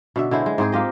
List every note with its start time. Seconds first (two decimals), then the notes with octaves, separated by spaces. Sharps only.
0.16 B2 D3 E5
0.31 D3 G#3 E4 C5
0.46 G#3
0.58 G#2 C4 G#4 C5
0.72 A#3 F4 G4 D#5